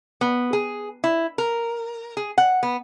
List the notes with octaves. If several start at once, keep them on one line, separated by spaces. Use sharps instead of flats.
B3
G#4
E4
A#4
G#4
F#5
B3